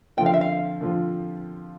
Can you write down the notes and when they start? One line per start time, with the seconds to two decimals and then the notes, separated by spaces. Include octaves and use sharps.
0.17 D3 F3 C4 F4 G5
0.26 F5
0.34 E5
0.41 F5
0.81 D3 F3 C4 F4